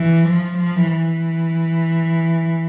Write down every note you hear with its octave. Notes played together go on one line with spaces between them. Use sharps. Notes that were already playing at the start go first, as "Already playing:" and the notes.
Already playing: E3
F3
F3
E3